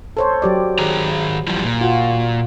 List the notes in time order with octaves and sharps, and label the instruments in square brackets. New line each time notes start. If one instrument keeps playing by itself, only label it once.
[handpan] A4 C5 C#5
F#3 G4 D5
[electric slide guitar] D#3 G#4 A#5
E3 F3 G3
A#2
[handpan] F4 F#4